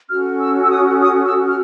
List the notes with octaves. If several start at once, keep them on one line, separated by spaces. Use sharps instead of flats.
C#4 F#4 A4 F6
E6
E6
D#6
D#6
E6
F6